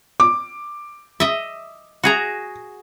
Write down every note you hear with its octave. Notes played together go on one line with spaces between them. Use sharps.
D6
D#5 E5
F#4 G#4 A#5